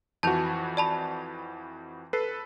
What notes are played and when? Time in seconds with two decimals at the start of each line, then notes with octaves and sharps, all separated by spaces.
0.23 F2 E3 F#4 A5 G6 F7
0.77 D5 A5 B5
2.13 A4 B4 C7